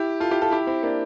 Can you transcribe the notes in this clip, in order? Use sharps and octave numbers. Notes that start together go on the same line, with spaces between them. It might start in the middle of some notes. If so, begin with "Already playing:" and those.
Already playing: E4 G4
F4 A4
E4 G4
F4 A4
E4 G4
C4 E4
A#3 D4